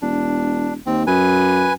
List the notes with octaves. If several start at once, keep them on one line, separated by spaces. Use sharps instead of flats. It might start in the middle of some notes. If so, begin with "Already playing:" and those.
E1 D4
D#2 C4
F#2 B4 G#5